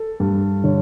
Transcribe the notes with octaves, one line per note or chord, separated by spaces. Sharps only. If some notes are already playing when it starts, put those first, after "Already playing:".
Already playing: A4
G2
D3 C#5